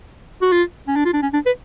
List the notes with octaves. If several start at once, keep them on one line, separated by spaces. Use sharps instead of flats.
F#4
F4
C#4
D4
F4
D4
C#4
D4
B4